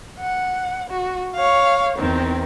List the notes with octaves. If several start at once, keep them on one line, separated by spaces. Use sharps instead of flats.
F#5
F#4
C#5 F5
E2 D#3 C4